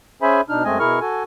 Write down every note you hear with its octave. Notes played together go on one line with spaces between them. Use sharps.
C#4 G#4 C5 E5 G#5 B5
B2 D4 D#4 F6
F#2 G#3 A3 C4 D#5 G#5
B2 E4 G#4 A#4 C#6 F6
F#4 A4 G#5